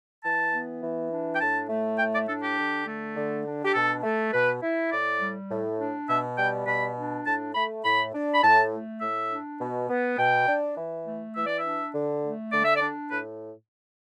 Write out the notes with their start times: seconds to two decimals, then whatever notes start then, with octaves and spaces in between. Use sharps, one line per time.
0.23 E3 A5
0.52 B3
0.81 E3
1.10 D4
1.35 G5
1.40 A2 A5
1.69 A3
1.98 A2 G5
2.13 D5
2.28 D4 A4
2.42 G4
2.57 D3
2.87 A3
3.16 D3
3.45 D4
3.64 G4
3.74 B2 A4
4.03 A3
4.32 B2 B4
4.62 E4
4.91 A2 D5
5.20 G3
5.50 A2
5.79 D4
6.08 B2 E5
6.37 G3 G5
6.66 B2 B5
6.97 D4
7.25 A2 A5
7.54 A3 B5
7.84 A2 B5
8.13 D4
8.34 B5
8.42 A2 A5
8.71 A3
9.01 A2 E5
9.30 D4
9.60 B2
9.89 B3
10.18 B2 G5
10.47 D4
10.77 E3
11.06 A3
11.35 E3 E5
11.46 D5
11.58 E5
11.64 D4
11.93 D3
12.23 A3
12.52 D3 D5
12.64 E5
12.76 D5
12.81 D4
13.10 A2 B4